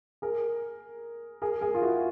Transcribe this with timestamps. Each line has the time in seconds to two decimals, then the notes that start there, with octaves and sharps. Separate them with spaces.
0.22 G#4 A#4
1.42 G#4 A#4
1.61 G#4 A#4
1.74 F4
1.81 E4 F#4